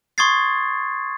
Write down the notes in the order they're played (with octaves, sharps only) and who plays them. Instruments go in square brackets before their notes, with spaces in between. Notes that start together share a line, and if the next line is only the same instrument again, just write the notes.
[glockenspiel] C6 C#6 D#6 G#6 A6 C7